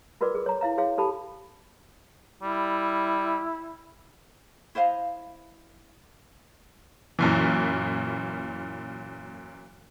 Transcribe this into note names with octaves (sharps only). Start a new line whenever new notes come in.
F4 F#4 A#4 B4 D5 D6
G#4
C#5 A#5
E4 F5 A#5
E4 F#4 G#4 C#5 F5
G4 A4 A5 B5
G3 E4
E4 C5 D#5 F5
F#2 A#2 E3